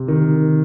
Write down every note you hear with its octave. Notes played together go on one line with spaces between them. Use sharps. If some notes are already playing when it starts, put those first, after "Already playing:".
Already playing: C3
D#3